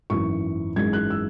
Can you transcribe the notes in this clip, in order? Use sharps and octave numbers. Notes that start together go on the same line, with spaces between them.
G#1 F#2 E3 C#6
G#1 F#2 E3 G#3 G#6
F#6
E6